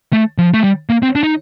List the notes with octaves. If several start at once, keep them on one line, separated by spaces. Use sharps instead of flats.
A3
F3
A3
G3
A#3
C4
D4
D#4